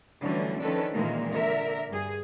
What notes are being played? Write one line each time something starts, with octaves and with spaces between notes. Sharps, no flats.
D3 E3 F#3 G3 A3 C#4
D#3 F3 C#4 D4 A4 B4
A#2 D#3 E3 G#3 A#3
D3 A#4 E5
G2 G#4